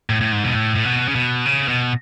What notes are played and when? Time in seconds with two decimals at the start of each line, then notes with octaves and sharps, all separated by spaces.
0.10 A2
0.21 A2
0.32 G#2
0.44 B2
0.55 A2
0.75 A2
0.85 B2
1.08 C#3
1.16 B2
1.46 C#3
1.68 B2